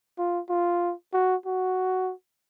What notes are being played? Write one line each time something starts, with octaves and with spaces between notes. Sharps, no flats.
F4
F4
F#4
F#4